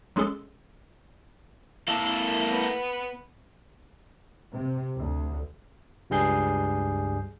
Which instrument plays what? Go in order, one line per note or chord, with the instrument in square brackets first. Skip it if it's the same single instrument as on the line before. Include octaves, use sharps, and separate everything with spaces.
[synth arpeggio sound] F#3 G#3 C#4 G#4 A4
[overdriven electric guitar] A#3 A4 [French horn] E4
[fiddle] B3
[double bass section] C3
D2
[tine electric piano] C#2 G2 G3 G#4 G6 C7